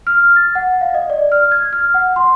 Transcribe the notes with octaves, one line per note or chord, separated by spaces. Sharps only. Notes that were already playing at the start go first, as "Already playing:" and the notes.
F6
A6
F#5
F5
D#5
D5
F6
G#6
F6
F#5
C6